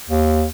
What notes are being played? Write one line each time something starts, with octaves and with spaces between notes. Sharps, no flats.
D#2